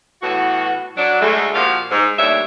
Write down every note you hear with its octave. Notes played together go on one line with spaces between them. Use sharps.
A2 E3 B3 F#4
F#3 D4
D2 G#3 A3
A#2 F3 F#4 G4 F5
G#2
D#2 G3 A3 D4 C#5 E5